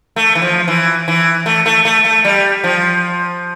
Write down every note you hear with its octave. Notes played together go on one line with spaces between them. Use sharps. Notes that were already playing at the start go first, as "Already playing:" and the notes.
A3
E3
F3
E3
E3
A3
A3
A3
A3
G3
F3